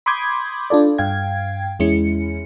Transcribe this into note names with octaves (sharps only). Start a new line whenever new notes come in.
B5 C6 D6 D#6 G6 G#6
D4 F4 A4 D5
G2 F5 G5 G#6
E2 G#3 C#4 E4 C#7